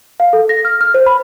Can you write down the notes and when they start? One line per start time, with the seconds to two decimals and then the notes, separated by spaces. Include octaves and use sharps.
0.20 F5
0.33 A4
0.49 A#6
0.65 F6
0.81 F6
0.94 C5
1.06 B5